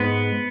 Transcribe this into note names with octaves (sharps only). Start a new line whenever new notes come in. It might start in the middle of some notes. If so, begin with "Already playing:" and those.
Already playing: G#2 G#3 B3